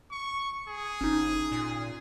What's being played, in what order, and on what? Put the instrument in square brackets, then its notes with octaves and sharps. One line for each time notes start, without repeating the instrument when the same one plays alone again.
[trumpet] C#6
G#4
[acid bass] G1 [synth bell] C#4 D#4
[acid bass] A#2